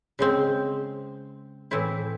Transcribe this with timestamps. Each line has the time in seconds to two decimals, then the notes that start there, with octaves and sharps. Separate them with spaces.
0.19 C#3 G#3 C4
1.71 A2 E3 C4 E4